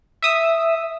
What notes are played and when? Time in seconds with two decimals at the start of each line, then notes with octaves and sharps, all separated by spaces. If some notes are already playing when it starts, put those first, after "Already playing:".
0.22 E5 D#6 E6